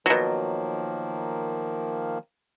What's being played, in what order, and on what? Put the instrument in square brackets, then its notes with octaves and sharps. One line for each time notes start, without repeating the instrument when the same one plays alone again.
[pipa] B2 F#3 [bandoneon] D#3 F3 A#3